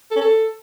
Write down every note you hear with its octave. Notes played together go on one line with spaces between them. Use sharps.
A4
C#4
A4